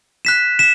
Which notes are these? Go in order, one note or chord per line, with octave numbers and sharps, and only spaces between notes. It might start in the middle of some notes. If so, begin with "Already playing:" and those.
F#6 B6 E7
B6 E7